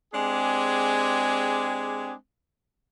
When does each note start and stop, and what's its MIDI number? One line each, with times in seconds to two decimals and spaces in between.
0.14 2.14 56
0.14 2.14 60
0.14 2.14 62
0.14 2.14 67
0.14 2.14 68